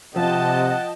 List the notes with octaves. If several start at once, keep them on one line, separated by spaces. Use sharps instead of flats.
C3 F3 D#5 F#5 G5 A5